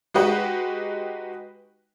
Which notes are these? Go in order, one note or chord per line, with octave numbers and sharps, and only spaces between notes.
G#3 D#4 F#4 G4 B4